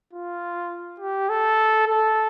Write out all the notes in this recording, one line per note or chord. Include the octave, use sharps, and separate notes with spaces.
F4
G4
A4
A4